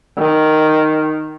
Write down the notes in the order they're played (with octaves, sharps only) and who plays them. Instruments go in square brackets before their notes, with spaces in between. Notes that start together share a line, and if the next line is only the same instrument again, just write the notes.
[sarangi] D#3